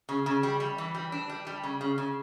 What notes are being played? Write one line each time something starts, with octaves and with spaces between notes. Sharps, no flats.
C#3
C#3
G3
G3
E3
G3
D4
G3
G3
C#3
C#3
C#3